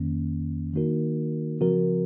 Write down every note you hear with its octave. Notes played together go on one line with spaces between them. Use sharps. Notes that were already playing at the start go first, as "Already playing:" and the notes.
Already playing: F2 D#3 A#3 C#4
D#3 A#3 D#4 F#4 A#4
C#3 F3 C4 F#4 A#4